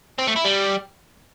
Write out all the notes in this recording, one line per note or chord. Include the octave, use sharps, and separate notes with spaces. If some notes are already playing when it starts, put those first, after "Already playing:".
C4
A3
E4
G3